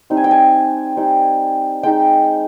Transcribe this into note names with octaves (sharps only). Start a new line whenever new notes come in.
G3 C4 D#4
G#5
G5
G#5
G3 C4 D#4
G#3 D#4 G5